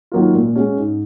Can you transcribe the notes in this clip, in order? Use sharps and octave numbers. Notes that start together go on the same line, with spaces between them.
D#3 F#3 A#3 F4
A#2
G#3 C#4 F#4
G#2